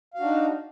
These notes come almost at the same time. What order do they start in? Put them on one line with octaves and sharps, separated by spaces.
F5 F#4 D4 D#4